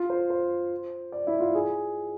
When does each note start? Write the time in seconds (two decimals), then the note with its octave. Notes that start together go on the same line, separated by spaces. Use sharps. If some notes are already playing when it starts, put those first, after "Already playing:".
Already playing: F4
0.10 C5
0.30 C5
1.12 D5
1.27 E4
1.40 F4
1.55 G#4